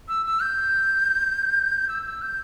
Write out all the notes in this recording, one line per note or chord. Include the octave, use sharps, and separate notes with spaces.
E6
E6
G6
E6
E6
G6